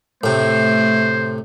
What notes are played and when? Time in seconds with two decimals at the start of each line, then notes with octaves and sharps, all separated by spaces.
0.24 A2 C3 A3 C5